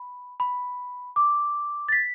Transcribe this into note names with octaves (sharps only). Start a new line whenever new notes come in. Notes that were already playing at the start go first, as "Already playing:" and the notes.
Already playing: B5
B5
D6
A6
B6